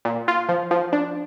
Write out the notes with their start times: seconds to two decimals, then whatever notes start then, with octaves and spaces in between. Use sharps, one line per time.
0.05 A#2
0.28 F4
0.49 F3
0.71 F3
0.93 D4